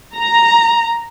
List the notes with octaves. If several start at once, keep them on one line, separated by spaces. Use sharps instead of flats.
A#5